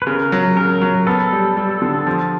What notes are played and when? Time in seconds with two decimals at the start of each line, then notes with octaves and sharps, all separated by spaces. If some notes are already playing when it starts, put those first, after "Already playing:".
0.02 B4
0.06 C#3 A#4
0.32 F#3
0.57 C#3 A#4
0.82 F#3
1.07 B3 A4
1.32 G3
1.57 G3
1.82 D3
2.07 F3